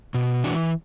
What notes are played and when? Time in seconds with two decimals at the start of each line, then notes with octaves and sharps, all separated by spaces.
0.14 B2
0.44 E3 D4 F#4